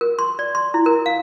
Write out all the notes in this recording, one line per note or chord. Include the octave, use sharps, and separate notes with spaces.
A#4
C6
D5
C6
E4
A#4
F5